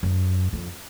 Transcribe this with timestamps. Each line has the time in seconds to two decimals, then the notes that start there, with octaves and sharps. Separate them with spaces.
0.03 F#2
0.53 F2